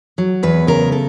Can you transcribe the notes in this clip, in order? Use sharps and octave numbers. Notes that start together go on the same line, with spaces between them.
F#3
E2 B4
C#3 A#4
A4